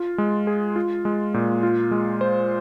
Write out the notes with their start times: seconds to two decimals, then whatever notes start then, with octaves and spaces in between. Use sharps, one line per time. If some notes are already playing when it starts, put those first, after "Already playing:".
Already playing: F4
0.18 G#3
0.47 G#4
0.76 F4
1.05 G#3
1.34 A#2
1.63 F4
1.91 G#3
2.21 C5